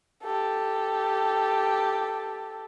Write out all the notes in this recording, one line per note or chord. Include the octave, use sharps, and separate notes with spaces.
G4 A4